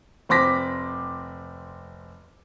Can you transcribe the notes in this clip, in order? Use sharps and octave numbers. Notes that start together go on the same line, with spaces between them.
F1 C4 C6 D6 A#6 B6